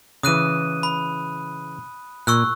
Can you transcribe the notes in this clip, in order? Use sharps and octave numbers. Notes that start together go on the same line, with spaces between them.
C#3 E3 D#6 F#6 D#7
B5
A#2 C#6 E6 F#6